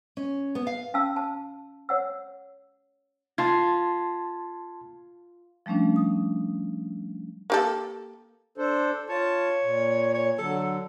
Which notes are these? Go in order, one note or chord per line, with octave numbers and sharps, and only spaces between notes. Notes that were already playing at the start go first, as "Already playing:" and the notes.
C#4
B3
F5
C#4 F5 A5 E6
A5
C#5 F#5 E6
F4 A5 C6 G#6
F3 G3 A3 C#4 D4
D#6
A#3 G4 A4
D4 A4 C5
F4 C#5 A5
A#2
C#5
D3 F#3 A4